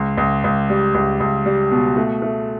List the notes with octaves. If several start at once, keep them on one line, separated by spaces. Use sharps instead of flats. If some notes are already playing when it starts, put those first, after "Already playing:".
Already playing: C#2
C#2
C#2
G3
C#2
C#2
G3
B2
A3
A3